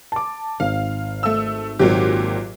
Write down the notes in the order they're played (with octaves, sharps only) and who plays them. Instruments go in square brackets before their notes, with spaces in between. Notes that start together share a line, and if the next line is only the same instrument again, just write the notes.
[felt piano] A5 D6
[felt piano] G#1 [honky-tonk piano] F5
[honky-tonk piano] A3 E6
[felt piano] G#1 [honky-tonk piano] A#2 F#3 G4